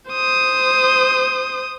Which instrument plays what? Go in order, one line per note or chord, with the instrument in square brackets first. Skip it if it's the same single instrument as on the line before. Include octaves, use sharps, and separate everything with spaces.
[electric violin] C5 D#6